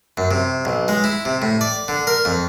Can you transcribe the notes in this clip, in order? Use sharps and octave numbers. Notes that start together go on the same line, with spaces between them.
F#2
C3
B1
G#3
E4
C3
A2
D5
D3
A#4
F2